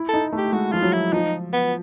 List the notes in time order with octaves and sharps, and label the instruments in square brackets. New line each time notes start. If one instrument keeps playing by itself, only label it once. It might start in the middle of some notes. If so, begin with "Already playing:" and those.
Already playing: [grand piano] E4
[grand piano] D#4 [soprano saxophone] A4
[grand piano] A3
[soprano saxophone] G4
[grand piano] G#3 [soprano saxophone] F#4
[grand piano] F3 [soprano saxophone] F4
[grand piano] F#3
[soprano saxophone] E4
[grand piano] F3 [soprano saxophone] D#4
[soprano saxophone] B3